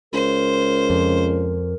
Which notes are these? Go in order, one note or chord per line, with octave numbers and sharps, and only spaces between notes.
C#2 A#4 C5
F2